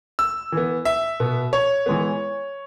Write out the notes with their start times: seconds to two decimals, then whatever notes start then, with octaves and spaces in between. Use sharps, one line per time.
0.19 E6
0.52 E3 B3
0.85 E5
1.20 B2 B3
1.53 C#5
1.86 E3 G#3 B3